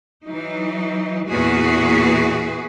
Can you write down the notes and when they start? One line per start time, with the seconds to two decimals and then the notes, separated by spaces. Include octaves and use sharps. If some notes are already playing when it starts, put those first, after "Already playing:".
0.24 E3 F#3 D#4
1.30 E2 A#2 E4 F#4 G#4 B4